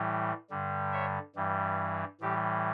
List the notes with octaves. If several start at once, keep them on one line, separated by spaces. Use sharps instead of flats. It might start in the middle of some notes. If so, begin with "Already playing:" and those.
Already playing: A2 E3 G3
G2 D3 G3
C#5 E5
G2 E3 G3
A2 E3 G3 G4